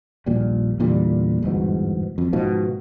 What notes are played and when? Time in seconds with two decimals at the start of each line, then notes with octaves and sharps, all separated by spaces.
0.26 A#1 D#2 A#2 G3
0.80 E2 A#2 D3 G3
1.43 G1 E2 G#2 B2
2.18 F2
2.33 G#2 B2 D#3 F3